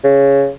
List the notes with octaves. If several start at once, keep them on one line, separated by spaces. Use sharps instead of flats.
C#3